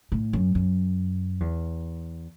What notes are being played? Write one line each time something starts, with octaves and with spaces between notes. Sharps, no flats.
A2
F#2
F#2
E2